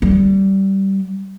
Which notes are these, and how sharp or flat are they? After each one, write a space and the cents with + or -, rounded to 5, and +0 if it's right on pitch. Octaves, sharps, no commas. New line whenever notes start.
G3 -20